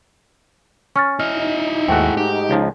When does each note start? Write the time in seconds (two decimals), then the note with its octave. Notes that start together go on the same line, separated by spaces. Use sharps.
0.96 C#4 C#6 F6 A6
1.19 E4 D#5 F6
1.36 D#4
1.88 D#2 G#2 A3 F#4 G5
2.17 D#4 G4
2.50 C#2 F3